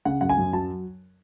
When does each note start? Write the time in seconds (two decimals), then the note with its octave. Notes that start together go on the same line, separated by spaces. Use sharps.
0.05 C#3 F#5
0.21 F#2 F#5
0.29 G#5
0.38 F#2
0.53 F#3 A5